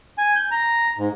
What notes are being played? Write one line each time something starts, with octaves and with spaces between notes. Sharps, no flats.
G#5
G6
A#5
G#2